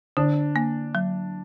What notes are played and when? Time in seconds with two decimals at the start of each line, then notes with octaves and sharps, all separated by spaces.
0.17 D3 D4
0.56 A#3
0.95 F#3